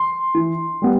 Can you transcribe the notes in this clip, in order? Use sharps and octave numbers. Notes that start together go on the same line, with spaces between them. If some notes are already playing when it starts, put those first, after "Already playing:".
Already playing: C6
E3
G3 B3